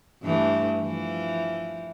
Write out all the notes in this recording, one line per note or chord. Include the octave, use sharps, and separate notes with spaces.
G2 E3 A3
E3 F3